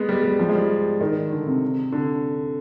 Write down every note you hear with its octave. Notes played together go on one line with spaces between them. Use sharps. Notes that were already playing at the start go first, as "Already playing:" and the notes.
Already playing: G#3 B3
G3
G3
F3
G#3
G3
D#3
D3
C3
D3